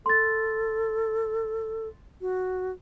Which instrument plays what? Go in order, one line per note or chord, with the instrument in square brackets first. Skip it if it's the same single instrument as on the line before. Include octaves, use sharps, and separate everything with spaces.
[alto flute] A4 [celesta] C6 A6
[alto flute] F#4